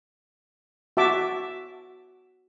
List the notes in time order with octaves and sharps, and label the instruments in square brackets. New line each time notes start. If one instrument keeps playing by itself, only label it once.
[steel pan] F#4 E5 A5 D6